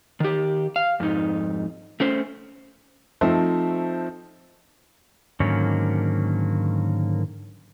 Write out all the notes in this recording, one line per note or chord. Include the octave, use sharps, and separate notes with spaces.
D#3 G4
F5
F2 G#2 D#4
A3 C#4 C5
F3 A3 C4 D#4 C5 E5
G#2 D3 D#3 F#3 A#3 C#4